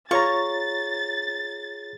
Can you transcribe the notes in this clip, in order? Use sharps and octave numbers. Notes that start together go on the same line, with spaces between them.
F4 G#4 C#5 A#5 C#6 A6